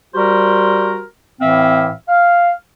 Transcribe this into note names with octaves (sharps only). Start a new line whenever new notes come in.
G3 F#4 G4 A#4 C5
A2 E3 C4 E5 F5
F5